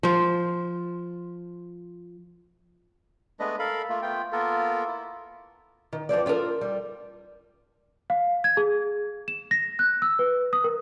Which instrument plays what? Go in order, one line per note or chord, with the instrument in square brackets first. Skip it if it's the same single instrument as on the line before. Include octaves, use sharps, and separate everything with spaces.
[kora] F3 C5
[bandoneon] G#3 A3 B3 D4 B4 D#5
A4 A#4 F5 B5
A3 A#3 F4
A3 B3 F4 G5
A#3 B3 F4 A4 A#4
E4
[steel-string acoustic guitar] D#3
E2 F3 C4 D5
F4 G4 A4 A#4
G3
[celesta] F5
G#6
G#4
E7
A#6
F#6
E6
B4
D#6
A#4